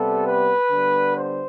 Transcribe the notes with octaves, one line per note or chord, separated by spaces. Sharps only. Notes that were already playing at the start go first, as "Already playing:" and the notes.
Already playing: C3 G3 B3 A4
B4
D3 G3 B3
C5